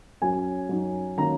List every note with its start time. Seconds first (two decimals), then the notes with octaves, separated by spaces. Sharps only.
0.22 F#2 F#3 C#4 G#5
0.69 F#2 F#3 D#4
1.17 D#3 F#3 A#3 C#4 A#5